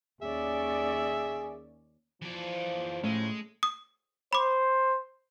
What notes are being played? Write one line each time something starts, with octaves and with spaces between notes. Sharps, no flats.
D#2 C#4 G#4 D5 E5
E3 F3 D5
A2 G#3 A3 C#4
D#6
C5 B5 D6